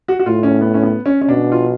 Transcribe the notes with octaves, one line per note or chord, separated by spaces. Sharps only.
F#4
F#4
A2 F4
C#4
B3
C#4
B3
C#4
C#4
B2 D4
F4